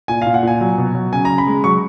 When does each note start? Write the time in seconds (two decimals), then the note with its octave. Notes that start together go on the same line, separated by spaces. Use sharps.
0.08 A#2 G#5
0.22 A#2 F5
0.34 F#5
0.43 A#2 G#5
0.61 F#3
0.78 B2
0.94 F#3
1.12 C#3 G#5
1.25 C#3 A#5
1.38 B5
1.47 G#3
1.64 F#3 C#6